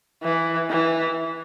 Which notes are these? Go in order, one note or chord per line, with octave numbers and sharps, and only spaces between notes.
E3
E3